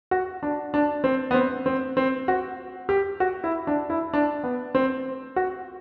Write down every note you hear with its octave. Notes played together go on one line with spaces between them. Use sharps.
F#4
D4
D4
C4
B3
C4
C4
C4
F#4
G4
F#4
E4
D4
E4
D4
B3
C4
F#4